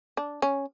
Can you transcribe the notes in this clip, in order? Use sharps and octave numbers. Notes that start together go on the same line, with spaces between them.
D4
C#4